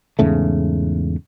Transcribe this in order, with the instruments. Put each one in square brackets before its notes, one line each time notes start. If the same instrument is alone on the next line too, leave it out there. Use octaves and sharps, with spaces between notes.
[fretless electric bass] E2 G#2 C#3 A3